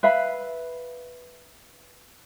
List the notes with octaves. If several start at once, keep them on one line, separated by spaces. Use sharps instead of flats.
B4 E5 F5 B5